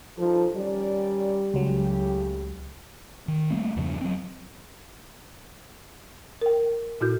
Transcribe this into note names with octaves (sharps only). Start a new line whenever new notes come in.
G2 F3 D#4 A4
D#3 G3 C#4 D5
C#2 A2 C#3 F#3 G4
D#3
G3 A3 A#3 C4
E2 G2 C#3 F3
F#3 C4
A#4 G5
A#2 E4 F#4 G6